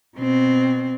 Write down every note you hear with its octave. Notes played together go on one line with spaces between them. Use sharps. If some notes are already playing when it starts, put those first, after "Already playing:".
B2 C4